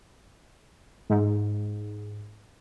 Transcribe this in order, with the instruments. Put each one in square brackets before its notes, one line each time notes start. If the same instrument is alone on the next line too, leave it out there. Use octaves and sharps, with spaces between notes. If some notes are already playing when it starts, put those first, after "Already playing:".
[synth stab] G#2